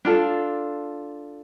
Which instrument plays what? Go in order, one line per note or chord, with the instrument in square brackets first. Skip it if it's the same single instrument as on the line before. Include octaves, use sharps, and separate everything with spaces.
[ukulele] D4 F4 A4